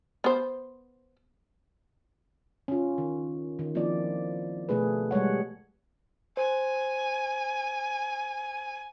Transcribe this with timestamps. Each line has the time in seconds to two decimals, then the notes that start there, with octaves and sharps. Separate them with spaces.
0.24 B3 C5
2.68 C#4 F4
2.98 D#3
3.59 D#3
3.75 F3 A#3 C4 E4 D5
4.69 B2 A3 G#4 B4
5.11 G3 G#3 C#5 F#5
6.37 C5 G#5